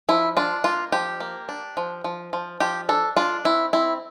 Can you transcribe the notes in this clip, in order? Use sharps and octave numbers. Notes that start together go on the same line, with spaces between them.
F3 E4
D4 F4
A#3 F4
F3 G4
A#3
D4
F3
F3
F3
F3 G4
D4 A4
D4 F4
C4 E4
C4 E4